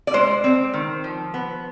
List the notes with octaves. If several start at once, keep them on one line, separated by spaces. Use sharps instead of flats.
D5
G#3 C5
C4
D#3
F3
B3